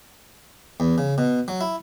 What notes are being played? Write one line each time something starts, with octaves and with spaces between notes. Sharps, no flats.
E2
C#3
B2
F#3
E4